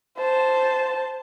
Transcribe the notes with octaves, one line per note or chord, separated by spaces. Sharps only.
C5 A5